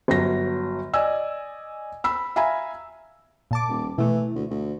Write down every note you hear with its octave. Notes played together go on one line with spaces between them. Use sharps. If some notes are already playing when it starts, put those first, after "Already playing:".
G1 F#3 A#6
D5 D#5 G#5 E6
B5 E6
E5 F5 G#5 A#5 B5
A#2 A5 D6
D#1
B2 E3 A3
D2
D2